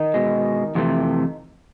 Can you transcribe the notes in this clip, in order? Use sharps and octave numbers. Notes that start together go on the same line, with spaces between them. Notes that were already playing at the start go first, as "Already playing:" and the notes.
Already playing: D#3 D#4
B2 G#3
F2 C3 E3 A3